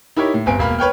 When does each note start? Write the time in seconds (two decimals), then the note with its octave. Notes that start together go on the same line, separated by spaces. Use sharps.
0.16 D#4 E4 G4 A#4 C#5
0.34 A2
0.46 G1 C4 G#5 D7
0.59 E1 A#3 B5 F6
0.79 B4 C#5 G5 F6